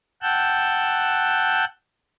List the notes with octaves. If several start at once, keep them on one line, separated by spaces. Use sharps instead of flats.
F#5 G5 A5 E6 F#6 G6